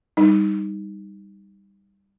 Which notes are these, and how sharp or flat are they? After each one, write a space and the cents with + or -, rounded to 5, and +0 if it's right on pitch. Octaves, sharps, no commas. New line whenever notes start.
G3 +10 D#4 +0